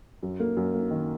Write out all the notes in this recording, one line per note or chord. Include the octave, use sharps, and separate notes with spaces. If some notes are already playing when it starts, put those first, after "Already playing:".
F#2
A#3
F#2
A#3
D#3